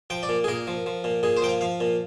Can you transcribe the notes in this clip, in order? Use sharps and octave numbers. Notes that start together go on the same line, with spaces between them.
F3 G5
D5
A#2
G#4
A#2 A#4
F3
F3
A#2
A#2 G#4
C5
F3 G5
F5
F3 F5
A#2